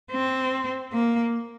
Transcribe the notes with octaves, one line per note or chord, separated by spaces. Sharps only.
C4
A#3